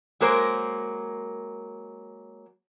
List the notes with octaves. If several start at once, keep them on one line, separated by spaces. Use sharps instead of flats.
F#3 G#3 A#3 A#4 C5